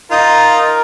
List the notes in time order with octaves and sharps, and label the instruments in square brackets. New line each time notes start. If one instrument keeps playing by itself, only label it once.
[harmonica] D#4 F4 [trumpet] A#4